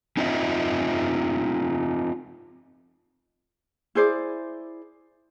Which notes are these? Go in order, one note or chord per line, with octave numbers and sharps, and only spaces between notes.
C4 D#4 F4 D#5 E5
E4 G#4 C5 D5